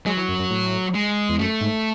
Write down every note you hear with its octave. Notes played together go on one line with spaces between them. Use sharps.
F#3 G#3
E3
F#2
F#2
A2
G#3
E2
F#2 A3
G#2